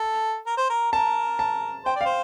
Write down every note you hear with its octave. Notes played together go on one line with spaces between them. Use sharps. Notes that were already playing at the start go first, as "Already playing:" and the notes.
Already playing: A4
A#4
C5
A#4
A#4 A5
A5
C5 G5
D5
C5 F5